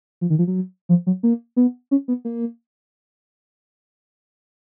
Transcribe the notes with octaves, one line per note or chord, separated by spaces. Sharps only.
F3
D#3
F3
F#3
F3
F#3
A#3
B3
C#4
B3
A#3